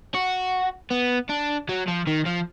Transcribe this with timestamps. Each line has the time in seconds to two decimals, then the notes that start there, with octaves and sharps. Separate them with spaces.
0.14 F#4
0.91 B3
1.30 D4
1.69 F#3
1.88 F3
2.07 D#3
2.26 F3